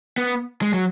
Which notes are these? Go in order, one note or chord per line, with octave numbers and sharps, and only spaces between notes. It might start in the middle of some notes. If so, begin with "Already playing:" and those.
B3
G#3
F#3